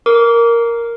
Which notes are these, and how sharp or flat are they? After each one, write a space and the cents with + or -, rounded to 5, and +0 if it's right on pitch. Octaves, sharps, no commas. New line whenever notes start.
A#4 +0 D6 -30